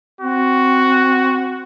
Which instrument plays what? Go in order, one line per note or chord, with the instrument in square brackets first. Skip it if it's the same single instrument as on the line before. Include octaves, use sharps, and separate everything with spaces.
[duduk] C4 [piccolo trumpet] F#4